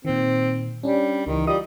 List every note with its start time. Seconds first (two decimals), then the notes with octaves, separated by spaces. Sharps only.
0.05 A#2 D#3 C4
0.83 G3 C#4 D4
1.27 C#2 D#3 E3
1.47 G3 F4 D#5 D#6